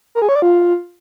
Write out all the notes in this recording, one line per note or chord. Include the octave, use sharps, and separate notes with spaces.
A#4
G#4
C#5
D5
F4